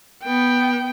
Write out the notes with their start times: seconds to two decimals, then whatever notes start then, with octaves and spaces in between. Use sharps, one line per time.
0.24 B3 G5